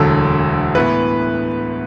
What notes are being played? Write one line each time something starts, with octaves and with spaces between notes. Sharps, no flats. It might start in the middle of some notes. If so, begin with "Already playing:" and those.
Already playing: E1 D2 D3 F#3 A4
A2 E3 B3 B4